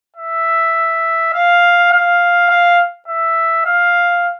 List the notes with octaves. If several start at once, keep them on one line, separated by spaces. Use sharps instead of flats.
E5
F5
F5
F5
E5
F5